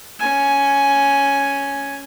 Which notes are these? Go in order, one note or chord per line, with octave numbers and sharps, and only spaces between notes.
C#4 G#5